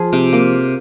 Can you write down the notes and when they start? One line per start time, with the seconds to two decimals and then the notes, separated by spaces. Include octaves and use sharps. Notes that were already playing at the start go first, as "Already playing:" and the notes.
Already playing: F3 G#4
0.13 C3
0.33 A#3